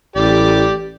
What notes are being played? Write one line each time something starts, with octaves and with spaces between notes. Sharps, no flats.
A1 G4 D5